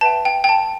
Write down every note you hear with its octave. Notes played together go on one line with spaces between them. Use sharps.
B4 E5 G5 A5
G5
G5
A5